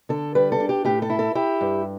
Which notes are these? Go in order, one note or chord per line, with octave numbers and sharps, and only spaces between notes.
D3 A4
G3 B4
A4
D4
G4
A2 G4
A4
E4
A4
E4 G4
G2